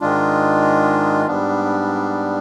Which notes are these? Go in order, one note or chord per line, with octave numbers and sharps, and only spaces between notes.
G#2 D#3 G#3 D4 F4
G#2 G3 B3 D4